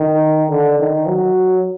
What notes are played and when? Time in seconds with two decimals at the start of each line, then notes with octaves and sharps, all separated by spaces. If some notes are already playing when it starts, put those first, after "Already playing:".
Already playing: D#3
0.49 D3
0.79 D#3
1.07 F#3